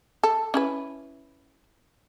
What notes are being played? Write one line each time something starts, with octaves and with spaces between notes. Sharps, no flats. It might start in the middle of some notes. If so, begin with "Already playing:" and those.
A4
C#4 E4 B4